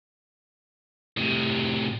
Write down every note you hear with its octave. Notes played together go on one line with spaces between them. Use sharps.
A2 C3